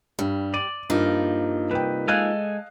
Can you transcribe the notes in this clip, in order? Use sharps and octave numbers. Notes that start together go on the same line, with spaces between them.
G2 G3
D5 D#7
G2 F3 A#3 D#4
C2 B4 G5
G#3 A4 D#5 F5 G#5 F#6